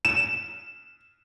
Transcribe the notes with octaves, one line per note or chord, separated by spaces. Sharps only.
E7